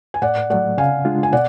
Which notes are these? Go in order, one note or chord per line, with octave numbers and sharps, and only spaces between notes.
G#5
A2 D5 F#5
F#3 A3 D5 F#5
C#3 F5 G#5
G#3 D4 F4
G#5
B2 D5 F#5